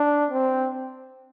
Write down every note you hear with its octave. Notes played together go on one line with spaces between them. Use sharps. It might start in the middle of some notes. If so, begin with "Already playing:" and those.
Already playing: D4
C4